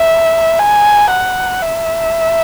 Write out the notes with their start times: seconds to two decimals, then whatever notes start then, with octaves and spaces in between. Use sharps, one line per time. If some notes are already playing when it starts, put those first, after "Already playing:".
Already playing: E5
0.59 G#5
1.11 F#5
1.62 E5